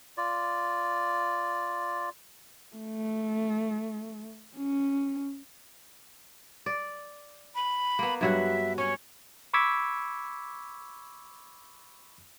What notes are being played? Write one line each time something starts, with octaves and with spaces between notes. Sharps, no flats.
F4 D5
A3
C#4
D5
B5
A#3 B3
G2 F#3 E5 F#5
C#4 C#5
B5 C#6 D6 E6 G#6 B6